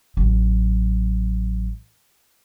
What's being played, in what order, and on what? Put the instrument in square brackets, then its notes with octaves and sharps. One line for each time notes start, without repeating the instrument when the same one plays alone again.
[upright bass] A1 F#3